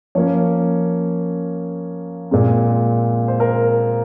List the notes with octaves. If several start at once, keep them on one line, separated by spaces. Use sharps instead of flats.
F3 A#3 C#4 C#5
A#2 G#3 C4
C5
A#4